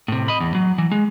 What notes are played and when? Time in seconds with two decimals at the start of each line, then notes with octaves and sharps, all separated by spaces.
0.08 A2 C3
0.28 D#5 B5
0.40 E2
0.55 F#3
0.78 E3
0.92 G#3